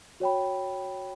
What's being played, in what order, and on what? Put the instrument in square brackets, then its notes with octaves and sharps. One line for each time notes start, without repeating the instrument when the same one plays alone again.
[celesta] F#4 C#5 G5 B5